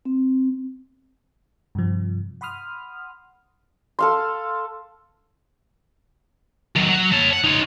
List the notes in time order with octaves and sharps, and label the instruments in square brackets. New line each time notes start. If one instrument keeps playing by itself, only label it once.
[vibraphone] C4
[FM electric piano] G2 C3 F3
F#5 B5 C6 D#6 F6
[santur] A4 F5 C6
[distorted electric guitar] D#3 F#3
F#3
C#5 A5
F#5
D#4 C#5